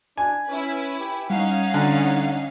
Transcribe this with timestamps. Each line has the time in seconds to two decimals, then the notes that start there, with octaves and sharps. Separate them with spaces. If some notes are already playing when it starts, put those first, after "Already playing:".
0.18 D4 G#5
0.48 C#4 E4 B4
1.00 G4
1.30 G3 C#4 D#4 F5 F#5
1.74 D3